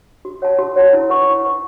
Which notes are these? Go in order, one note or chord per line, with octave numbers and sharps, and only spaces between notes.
F#4
C#5 F#5 A5
F#4
C#5 F#5 A5
E4
B4 F#5 C#6
E4
B4 F#5 C#6